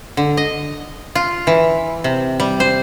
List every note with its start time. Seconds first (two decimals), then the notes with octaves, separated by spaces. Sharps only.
0.17 D3
0.37 D#5
1.15 F4
1.47 E3
2.04 C3
2.40 G3
2.60 C5